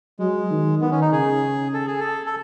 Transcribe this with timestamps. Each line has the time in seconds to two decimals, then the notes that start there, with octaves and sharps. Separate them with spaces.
0.19 F#3 G#3
0.50 D#3
0.81 D#3 B3
0.91 C#4
1.01 D#4
1.12 C#3 G#4
1.74 A4
1.87 G#4
2.00 A4
2.26 A4